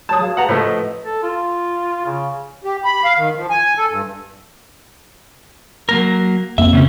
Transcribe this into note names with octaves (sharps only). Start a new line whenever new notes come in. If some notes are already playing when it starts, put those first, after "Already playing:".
F#3 A5 D#6
F#4 G#4 F5
B4 F#5 A5 A#5
A2 F3 A3 B4 C5 D#5
A4
F4
C#3
G4
B5
F5
D#3
F3
G#5
A4
G2
F#3 A#3 A#4
F2 A#3 C4 E5
C#3 B3 C#4